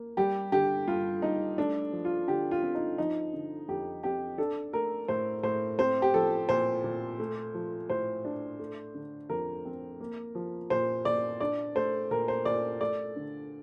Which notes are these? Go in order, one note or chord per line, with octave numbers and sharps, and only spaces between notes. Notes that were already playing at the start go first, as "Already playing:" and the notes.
Already playing: A#3
G3 G4
D3 G4
G2 F4
G2 D#4
A3 D4
F3
F4
D3 G4
F4
C4
D#4
F3 D#4
D3
F2 G4
C4 G4
D4 A4
A3 A#4
A2 C5
A2 C5
C4 C5
G4
F3 A4
A#2 C5
A#2
A3
F3
A2 C5
D4
A3
D3
F2 A#4
C4
A#3
F3
A#2 C5
A#2 D5
D4 D5
A3 C5
A#2 A#4
C5
A#2 D5
A3 D5
D3